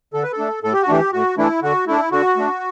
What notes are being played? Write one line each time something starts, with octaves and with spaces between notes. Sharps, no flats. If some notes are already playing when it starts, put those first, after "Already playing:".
D3 A4
B4
A4
A3 D4
A2 A4
G4
F#4
E3 A3 D4 G4
A2 F#4
E3 A3 D4 E4
D3 F#4
A3 D4 E4
D3 F#4
A3 D4